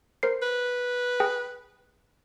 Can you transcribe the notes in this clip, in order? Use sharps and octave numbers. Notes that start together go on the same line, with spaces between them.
A#4 C5 C7
B4
G#4 G5